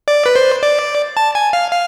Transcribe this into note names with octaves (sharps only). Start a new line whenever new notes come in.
D5
B4
C5
D5
A5
G#5
F5
F5